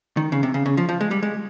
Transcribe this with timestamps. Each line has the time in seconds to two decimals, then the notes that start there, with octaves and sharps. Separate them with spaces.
0.17 D#3
0.32 C#3
0.43 C3
0.54 C#3
0.66 C#3
0.77 F3
0.89 F3
1.01 G#3
1.11 G3
1.23 G#3